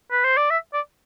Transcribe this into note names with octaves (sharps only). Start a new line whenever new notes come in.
B4
C5
D5
E5
D5